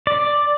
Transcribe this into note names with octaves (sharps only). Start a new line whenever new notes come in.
D5